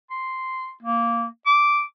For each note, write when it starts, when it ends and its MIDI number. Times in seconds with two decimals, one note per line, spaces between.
0.10 0.71 84
0.82 1.26 58
1.46 1.82 86